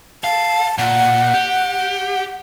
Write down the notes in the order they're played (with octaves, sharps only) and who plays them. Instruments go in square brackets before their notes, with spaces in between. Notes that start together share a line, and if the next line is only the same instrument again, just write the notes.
[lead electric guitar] F5 [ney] A5
[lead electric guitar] A#2 [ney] F#5
[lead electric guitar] G4